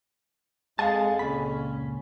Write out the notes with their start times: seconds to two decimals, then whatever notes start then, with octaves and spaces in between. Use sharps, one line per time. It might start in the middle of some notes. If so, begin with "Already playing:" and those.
0.79 F2 G#3 G#4 F5 F#5 G#5 A5
1.19 C#2 A#2 C#4 B5